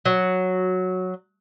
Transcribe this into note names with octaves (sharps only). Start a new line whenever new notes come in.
F#3